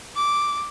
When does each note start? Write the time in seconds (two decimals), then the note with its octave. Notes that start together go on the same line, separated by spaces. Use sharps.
0.16 D6